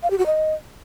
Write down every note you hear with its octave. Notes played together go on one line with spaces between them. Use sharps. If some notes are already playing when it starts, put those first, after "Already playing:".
F5
G4
F#4
D#5